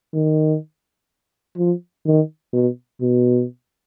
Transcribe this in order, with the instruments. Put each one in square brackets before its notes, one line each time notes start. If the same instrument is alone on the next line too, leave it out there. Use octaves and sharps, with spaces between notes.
[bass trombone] D#3
F3
D#3
B2
B2